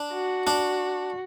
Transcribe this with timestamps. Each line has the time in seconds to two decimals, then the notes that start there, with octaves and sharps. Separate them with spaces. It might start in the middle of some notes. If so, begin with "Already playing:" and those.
Already playing: D4
0.13 F#4
0.47 D4